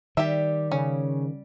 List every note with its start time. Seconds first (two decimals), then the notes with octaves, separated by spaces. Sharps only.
0.17 D#3 G3 G4 E5
0.72 C#3 C#4